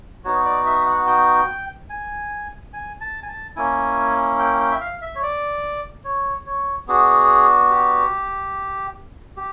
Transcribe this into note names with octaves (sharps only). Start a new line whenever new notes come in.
B3 D#4 F#4 C#5
D5
E5
F#5
G5
G#5
G#5
A5
G#5
A5
A#3 C#4 E4 G#5
G5
G5
E5
F5
E5
C#5
D5
C#5
C#5
B3 D4 F#4 G#4
G4
G4